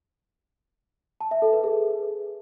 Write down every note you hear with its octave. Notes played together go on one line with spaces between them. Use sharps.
A5
E5
A4
B4
G#4